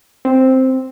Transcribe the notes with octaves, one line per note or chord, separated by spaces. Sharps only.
C4